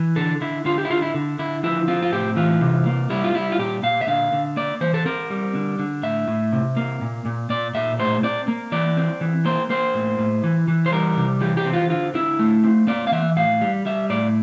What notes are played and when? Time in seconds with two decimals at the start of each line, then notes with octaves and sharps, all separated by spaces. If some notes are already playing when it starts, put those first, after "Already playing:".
Already playing: E3
0.16 D3 A4
0.41 D3 E4
0.65 D3 F4
0.78 G4
0.85 E4
0.90 D3 F4
1.02 E4
1.14 D3
1.39 D3 E4
1.63 F3 E4
1.88 C4 F4
2.03 F4
2.12 A2 G4
2.36 E3 F4
2.61 C3
2.86 A#3
3.10 G3 E4
3.24 F4
3.34 G3 E4
3.52 F4
3.59 A#2 G4
3.83 A#2 F5
4.01 E5
4.08 D3 F5
4.32 D3
4.56 A#3 D5
4.81 E3 C5
4.94 A4
5.06 C4 A#4
5.30 G3
5.55 D3
5.79 D3
6.03 A2 E5
6.28 A2
6.53 C3
6.77 A#3
7.01 A#2
7.25 A#2
7.50 A#2 D5
7.75 A#2 E5
7.99 A2 C5
8.23 C4 D5
8.48 A#3
8.72 E3 D5
8.97 C4
9.21 E3
9.45 A#3 C5
9.70 A#3 C5
9.94 A2
10.19 A2
10.44 E3
10.68 E3
10.86 C5
10.92 G3 A#4
11.17 C3
11.41 E3 G4
11.57 G4
11.66 C4
11.73 F4
11.90 D3 F4
12.14 D3 E4
12.39 A3
12.64 C4
12.87 A#3 D5
13.07 F5
13.12 E3 E5
13.36 A2 F5
13.61 G3
13.86 G3 E5
14.10 A2 D5